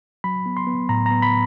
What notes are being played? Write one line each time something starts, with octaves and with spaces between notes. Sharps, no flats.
F#3 B5
B3
C6
B3
A2 A#5
B3 A#5
B5